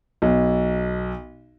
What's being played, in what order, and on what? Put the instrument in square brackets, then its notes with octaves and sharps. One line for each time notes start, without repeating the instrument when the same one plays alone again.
[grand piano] B1